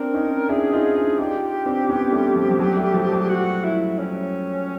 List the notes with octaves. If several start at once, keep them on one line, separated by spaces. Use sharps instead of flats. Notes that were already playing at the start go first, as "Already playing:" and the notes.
Already playing: C4 D4 A#4
C#4 D#4
D4 E4 G#4
D#4 F4
D4 E4
D#4 F4 G4
C4 D4
B3 C#4
G3 A3
F3
F3
F#3
G3 A3
F3 G3
F#3
F#4
E4
C#4